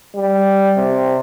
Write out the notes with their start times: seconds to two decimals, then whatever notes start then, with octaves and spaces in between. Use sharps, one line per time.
0.15 G3
0.77 C3